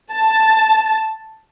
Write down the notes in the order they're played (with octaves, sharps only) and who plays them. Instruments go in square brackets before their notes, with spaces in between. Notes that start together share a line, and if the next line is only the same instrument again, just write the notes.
[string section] A5